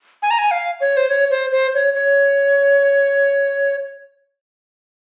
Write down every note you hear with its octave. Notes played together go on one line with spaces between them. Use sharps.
G#5
A#5
G#5
F5
C#5
C5
C#5
C5
C5
C#5
C#5